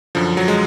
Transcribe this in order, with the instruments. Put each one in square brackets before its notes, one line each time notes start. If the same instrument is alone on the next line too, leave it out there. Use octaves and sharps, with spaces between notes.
[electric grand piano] F#2 D3 F3
F#3
G#3